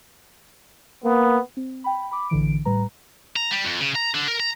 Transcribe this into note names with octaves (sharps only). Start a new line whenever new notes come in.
A#3 B3
C4
G5 B5
B5 D6
A1 D3 E3 D7
A2 G3 B4 A#5
A#5
G3
F2
C#3
A#5
D3
A#4
A#5